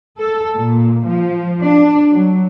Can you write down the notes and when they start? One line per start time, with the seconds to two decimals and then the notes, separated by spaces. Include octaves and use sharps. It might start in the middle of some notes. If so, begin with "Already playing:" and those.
0.18 A4
0.55 A#2
1.05 F3
1.61 D4
2.12 F#3